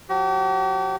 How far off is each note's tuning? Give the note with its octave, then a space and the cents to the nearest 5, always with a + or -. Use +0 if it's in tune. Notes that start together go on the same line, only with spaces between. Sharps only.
F3 +45 G4 -40